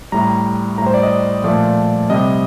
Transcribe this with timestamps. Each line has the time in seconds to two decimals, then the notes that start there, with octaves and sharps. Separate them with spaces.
0.12 A2 G3 A#5
0.78 A2 A#5
0.82 G3 C5
0.94 D5
1.03 D#5
1.43 A#2 F3 A3 D5
2.10 C3 G3 D#5